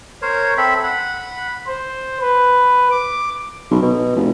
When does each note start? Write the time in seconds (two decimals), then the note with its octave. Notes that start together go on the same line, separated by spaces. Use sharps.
0.22 A#4 C5 C#5
0.58 C4 A4 E5 B5
0.83 F#5 B5
1.67 C5
2.21 B4
2.91 D6
3.71 B1
3.82 B2
4.16 F1